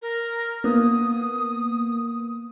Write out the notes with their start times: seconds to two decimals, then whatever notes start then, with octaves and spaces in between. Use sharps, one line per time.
0.02 A#4
0.64 A#3 B3 D#6